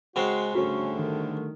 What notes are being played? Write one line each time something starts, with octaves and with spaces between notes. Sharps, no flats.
C#3 G#3 C4 F#4
D3 G3 A3 C#4 F#4
D#3